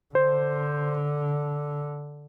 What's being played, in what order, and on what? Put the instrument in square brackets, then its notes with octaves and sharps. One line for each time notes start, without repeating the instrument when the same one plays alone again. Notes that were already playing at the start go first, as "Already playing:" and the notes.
[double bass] D3 [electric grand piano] C5